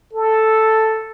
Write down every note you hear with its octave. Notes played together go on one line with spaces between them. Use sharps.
A4